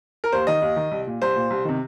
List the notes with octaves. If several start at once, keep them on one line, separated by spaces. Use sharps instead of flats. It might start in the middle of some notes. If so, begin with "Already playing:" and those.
A#4
D#2 C5
D#3 D#5
D#2
D#3
C2
A#2
C2 C5
A#2
C2
C3 D#3